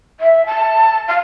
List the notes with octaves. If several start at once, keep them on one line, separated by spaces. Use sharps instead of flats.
E5
A5
F5